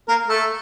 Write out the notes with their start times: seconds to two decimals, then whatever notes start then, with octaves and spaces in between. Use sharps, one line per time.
0.08 A#3 A#4
0.28 A3 A4